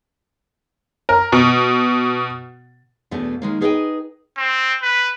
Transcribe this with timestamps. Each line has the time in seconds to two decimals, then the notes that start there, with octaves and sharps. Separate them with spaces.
1.09 A#4
1.32 B2
3.11 E2 B2 A3 D4
3.42 D#3 G#3 A#3
3.61 D#4 G#4 B4 D5 D#5 G5
4.37 C4
4.82 B4